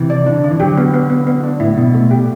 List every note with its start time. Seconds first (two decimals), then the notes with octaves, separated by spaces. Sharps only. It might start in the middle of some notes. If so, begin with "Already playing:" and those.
Already playing: C3 E3
0.10 D5
0.26 D3 D4
0.44 D4
0.51 E3
0.60 D3 F#3 G4
0.78 B3
0.94 B3
1.10 B3
1.27 B3
1.43 D4
1.60 A2 E4
1.77 B2 E4
1.94 A3
2.11 G4